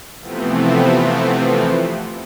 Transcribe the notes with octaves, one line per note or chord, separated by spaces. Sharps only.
C3 E3 F3 A3 B3 C4